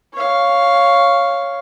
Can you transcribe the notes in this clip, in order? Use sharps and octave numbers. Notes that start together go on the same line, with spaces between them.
C#5 F5